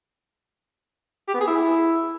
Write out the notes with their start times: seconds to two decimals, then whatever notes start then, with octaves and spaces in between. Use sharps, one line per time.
1.28 G4
1.34 B3
1.41 G#4
1.47 E4